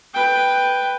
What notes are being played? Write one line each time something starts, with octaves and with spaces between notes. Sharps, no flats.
B4 G5